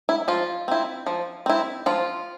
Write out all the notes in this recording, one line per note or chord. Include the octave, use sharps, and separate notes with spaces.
E4
F3 F4
C4 E4
F3
C4 E4
F3 F4